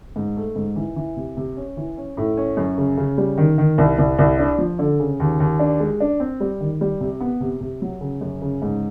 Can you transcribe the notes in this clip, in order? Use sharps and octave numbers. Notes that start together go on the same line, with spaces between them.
G#2
A3
G#2
E3
E3
C3
C3
C#4
E3
C#4
A2
C#4
F#2
C#3
C#3
G3
D#3
D#3
C2
C2
C2
D4
F3
D3
C#3
D#2
D#2
D4
G#3
D4
C4
G3
D#3
G3
C3
B3
C3
C3
F#3
C#3
F#2
C#3
G#2